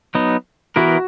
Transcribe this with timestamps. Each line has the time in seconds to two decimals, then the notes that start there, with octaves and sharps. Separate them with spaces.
0.15 F#3 B3 D#4
0.76 E3 B3 E4 F#4 A#4